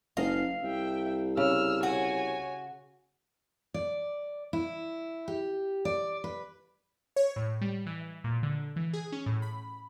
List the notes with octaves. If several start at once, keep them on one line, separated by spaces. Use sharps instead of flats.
F#1 D#5 F5
C2 E5 G5
C#3 E6 F6
F#4 C#5 G#5
D5
E4
G4
D5
B4
C#5
A2
G3
E3
A#2
D3
E3
G#4
C#4
A2
B5